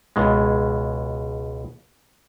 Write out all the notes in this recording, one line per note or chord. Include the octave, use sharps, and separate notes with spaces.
C#2 B2 G#3